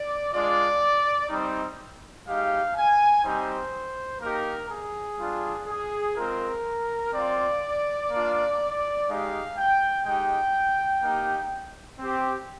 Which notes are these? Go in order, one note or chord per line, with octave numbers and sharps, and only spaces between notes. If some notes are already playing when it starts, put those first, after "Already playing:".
Already playing: D5
G#3 D4 F4 D5
G3 C4 D#4
G#3 D#4 G4 F5
G#5
G3 C4 D#4 G4 C5
A#3 D#4 G4 A#4
G#4
G3 D4 F4
G#4
G#3 C4 F4 A#4
C4 F4 D5
A#3 D4 F4
G#3 D#4 G4 F5
G5
G#3 D#4 G4 G5
A#3 D#4 G4
C4 G4